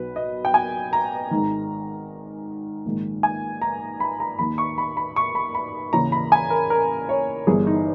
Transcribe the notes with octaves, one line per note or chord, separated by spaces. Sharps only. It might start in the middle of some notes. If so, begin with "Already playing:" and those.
Already playing: B1 B2 B4
D#5
G5
G#5
A#5
G#1 G#2 D#3
A#1 G#2 D#3
G#5
A#5
B5
A#5
D#2 D#3 B5
C#6
B5
B5
C#6
B5
B5
D#2 C#3 E3 A#5
B5
G#5
A#4
A#4
C#5
G1 G2 E3 G#4
D#4